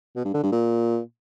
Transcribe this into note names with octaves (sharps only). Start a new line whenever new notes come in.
B2
G2
D3
G2
A#2